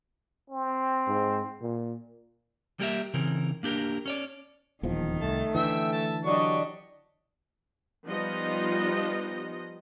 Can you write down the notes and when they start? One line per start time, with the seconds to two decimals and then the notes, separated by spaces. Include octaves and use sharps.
0.50 C4
1.07 G#2
1.62 A#2
2.80 G3 A#3 G4 G#4 A#4 E5
3.14 C#3 E3 C4 A#4
3.63 A#3 D4 G4 A#4
4.06 C#4 C#5 D5
4.83 D#1 E2 D#3 F3
5.21 C2 A3 A5
5.55 D3 E3 E5 G5 E6
5.92 E5 A5
6.25 F#3 D4 G4 D5 D#5 C#6
8.06 F3 G3 B3 D#4 F4 D#5